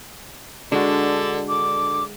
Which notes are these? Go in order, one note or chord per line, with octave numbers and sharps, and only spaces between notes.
D3 G#3 D4 F#4
D3 D6